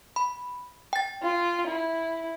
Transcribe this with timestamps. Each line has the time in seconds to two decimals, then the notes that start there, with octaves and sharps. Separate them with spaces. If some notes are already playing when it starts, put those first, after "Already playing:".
0.16 B5
0.93 G5 A6
1.23 F4
1.67 E4